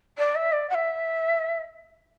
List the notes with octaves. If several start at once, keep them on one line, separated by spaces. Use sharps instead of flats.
D5
E5
D5
F#5
E5